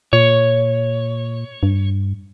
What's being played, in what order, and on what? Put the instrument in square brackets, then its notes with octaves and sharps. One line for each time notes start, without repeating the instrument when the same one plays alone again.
[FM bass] A#2 [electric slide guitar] C#5
[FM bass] G2